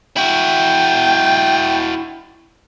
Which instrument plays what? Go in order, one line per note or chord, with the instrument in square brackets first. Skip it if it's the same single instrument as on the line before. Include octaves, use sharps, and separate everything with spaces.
[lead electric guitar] E4 F#4 [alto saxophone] G5